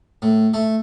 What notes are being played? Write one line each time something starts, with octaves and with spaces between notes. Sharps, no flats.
A2
A3